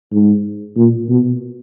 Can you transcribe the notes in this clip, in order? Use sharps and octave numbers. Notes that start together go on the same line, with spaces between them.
G#2
A#2
B2